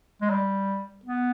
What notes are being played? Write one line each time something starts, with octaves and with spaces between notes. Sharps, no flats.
G#3
G3
B3